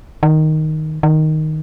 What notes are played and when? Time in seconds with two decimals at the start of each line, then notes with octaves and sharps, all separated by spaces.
0.23 D#3
1.03 D#3